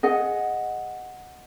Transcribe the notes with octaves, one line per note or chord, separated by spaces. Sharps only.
G#4 D#5 F#5